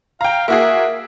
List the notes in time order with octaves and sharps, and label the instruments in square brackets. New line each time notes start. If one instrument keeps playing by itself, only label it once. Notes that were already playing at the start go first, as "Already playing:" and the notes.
[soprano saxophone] F5 [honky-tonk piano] G5 A#5
[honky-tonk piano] A#3 F#4 G#4 [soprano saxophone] E5